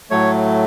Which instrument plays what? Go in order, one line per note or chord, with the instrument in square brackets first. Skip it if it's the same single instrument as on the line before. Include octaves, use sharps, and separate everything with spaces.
[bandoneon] A2 F#3 A3 C#5